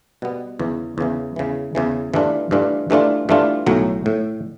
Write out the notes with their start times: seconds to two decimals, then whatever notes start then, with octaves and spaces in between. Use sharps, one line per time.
0.22 B2 G3 B3
0.59 E2 C#3 E3
0.98 E2 C#3 E3
1.36 E2 C#3 E3
1.75 E2 C#3 E3
2.14 G2 E3 A3 D4 F4
2.51 G2 E3 A3 D4 F4
2.90 G2 E3 A3 D4 F4
3.29 G2 E3 A3 D4 F4
3.66 B1 A2 F#3
4.06 A2